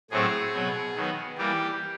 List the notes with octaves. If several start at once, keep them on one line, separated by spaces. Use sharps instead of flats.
A2 F#3 A3 C4 G#4
B2 F#3 B3
D#3 F#3 B3
E3 G3 A#3 G4